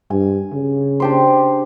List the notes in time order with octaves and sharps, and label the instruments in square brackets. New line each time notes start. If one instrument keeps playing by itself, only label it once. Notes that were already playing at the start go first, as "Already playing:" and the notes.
[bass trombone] G2 [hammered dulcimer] G#5
[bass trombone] C#3
[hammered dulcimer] D4 G4 C5